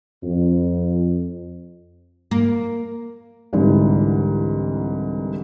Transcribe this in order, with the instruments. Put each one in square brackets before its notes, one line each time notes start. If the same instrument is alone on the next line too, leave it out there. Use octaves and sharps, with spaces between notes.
[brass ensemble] F2
[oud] A#3
[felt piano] C2 G#2 D3 E3